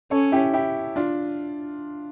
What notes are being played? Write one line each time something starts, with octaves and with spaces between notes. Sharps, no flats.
C#4 A4 C#5
E4 G4
E4 G4
D4 F4